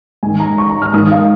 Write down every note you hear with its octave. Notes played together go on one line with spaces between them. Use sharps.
G#2 D#3 G#5
A#5
C#6
A#5
F6
G#2 D#3 D#6
F5